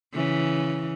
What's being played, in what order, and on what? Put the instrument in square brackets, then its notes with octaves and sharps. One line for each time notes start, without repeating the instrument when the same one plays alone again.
[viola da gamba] C#3 E3